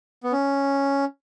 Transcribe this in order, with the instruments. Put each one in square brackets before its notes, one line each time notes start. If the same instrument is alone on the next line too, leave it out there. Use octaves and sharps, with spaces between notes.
[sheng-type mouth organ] B3
C#4